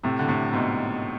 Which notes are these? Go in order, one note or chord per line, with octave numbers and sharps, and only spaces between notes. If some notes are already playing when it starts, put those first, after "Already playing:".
A2 C3
D3
A2 C3
G#2 B2